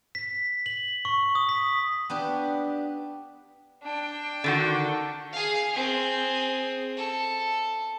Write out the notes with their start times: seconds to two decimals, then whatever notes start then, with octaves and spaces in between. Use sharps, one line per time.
0.15 B6
0.66 F#7
1.05 C#6
1.35 D#6
1.49 B6
2.10 B3 D4 G4
3.83 D4 G5
4.44 D3 D#3 F#4
5.33 G#4 F5
5.73 C4 G#4
6.97 A4